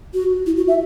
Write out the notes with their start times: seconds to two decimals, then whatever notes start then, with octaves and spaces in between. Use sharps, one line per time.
0.14 F#4
0.46 E4
0.57 F#4
0.68 E5